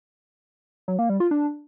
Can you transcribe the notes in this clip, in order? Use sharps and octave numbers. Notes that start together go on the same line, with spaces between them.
F#3
A#3
G3
F4
D4